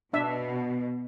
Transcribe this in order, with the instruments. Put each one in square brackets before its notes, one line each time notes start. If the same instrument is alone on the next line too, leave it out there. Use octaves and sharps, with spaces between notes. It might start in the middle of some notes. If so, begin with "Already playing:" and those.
[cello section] B2 [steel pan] D4 E5